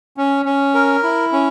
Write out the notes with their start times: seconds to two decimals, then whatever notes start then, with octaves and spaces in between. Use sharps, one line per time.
0.17 C#4
0.46 C#4
0.74 A#4
1.03 E4
1.32 C#4